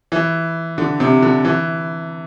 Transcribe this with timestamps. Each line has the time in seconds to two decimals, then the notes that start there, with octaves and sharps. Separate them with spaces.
0.12 E3
0.78 D3
1.00 C3
1.22 D3
1.45 E3